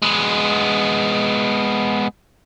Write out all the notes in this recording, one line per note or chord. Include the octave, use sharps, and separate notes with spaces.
G#3 B3